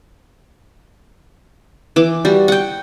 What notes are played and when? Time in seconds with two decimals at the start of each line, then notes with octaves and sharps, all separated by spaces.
1.96 E3 D6
2.25 G3 F#4
2.48 F#5 G5